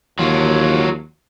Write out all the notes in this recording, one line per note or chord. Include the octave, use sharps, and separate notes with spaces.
D#2 F#3 F4